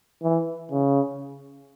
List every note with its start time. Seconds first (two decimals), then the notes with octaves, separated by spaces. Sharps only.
0.23 E3
0.71 C#3